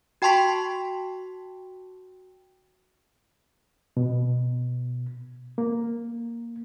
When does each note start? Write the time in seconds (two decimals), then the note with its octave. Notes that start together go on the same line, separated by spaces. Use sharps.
0.22 F#4 G5 A5 C6 C#6 B6
3.97 B2
5.58 A#3